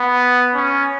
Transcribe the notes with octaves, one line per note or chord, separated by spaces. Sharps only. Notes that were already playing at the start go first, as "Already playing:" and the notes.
Already playing: B3
C#4